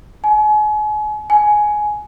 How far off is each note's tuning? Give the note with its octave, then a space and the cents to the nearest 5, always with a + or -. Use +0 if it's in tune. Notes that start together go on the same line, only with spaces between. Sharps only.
G#5 +35
G#5 +10